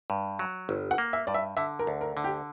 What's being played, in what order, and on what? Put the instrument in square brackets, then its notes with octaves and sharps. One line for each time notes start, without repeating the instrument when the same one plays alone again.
[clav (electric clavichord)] G2
F#3
G1
[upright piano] F#5
[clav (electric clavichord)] A#3
[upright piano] E5
[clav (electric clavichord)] G2 [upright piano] D5
[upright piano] E5
[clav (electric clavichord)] D3 [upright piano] E5
[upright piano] A#4
[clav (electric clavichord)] D2
[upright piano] A#4
[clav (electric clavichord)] D3
[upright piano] G4